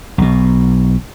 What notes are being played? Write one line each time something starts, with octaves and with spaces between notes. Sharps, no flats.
B1 B2